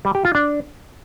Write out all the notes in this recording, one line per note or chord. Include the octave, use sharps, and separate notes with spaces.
G3
G4
F4
D4